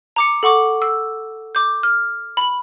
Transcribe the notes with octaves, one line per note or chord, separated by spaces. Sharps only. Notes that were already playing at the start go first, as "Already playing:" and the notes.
A#5 D6 C#7
A4 F#5 C#6 D6
E6
D6 G6
F6
B5 F#7